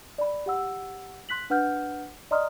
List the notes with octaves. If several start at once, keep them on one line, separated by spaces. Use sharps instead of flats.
D5 B5
G4 F#5 E6
C6 F#6 B6 F#7
D4 B4 F#5 F6 G6
D5 D#5 A#5 C6 D#6 F6